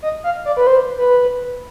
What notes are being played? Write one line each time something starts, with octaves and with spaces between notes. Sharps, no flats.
D#5
F5
D5
B4
C5
B4